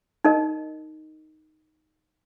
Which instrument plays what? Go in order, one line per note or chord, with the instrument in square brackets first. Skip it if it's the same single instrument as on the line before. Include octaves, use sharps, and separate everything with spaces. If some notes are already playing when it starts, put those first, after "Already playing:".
[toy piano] D#4 A#4 D#5